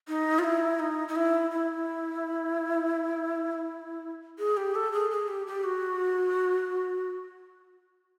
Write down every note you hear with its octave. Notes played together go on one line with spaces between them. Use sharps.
D#4
F4
E4
D#4
D#4
E4
E4
G#4
G4
A4
G#4
G#4
G4
G4
F#4